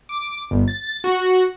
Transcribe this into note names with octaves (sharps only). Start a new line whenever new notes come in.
D6
G1
A6
F#4